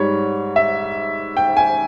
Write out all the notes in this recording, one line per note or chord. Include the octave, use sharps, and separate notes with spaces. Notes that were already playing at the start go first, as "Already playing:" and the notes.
Already playing: G#2 G3 C#5
E5
G5
G#5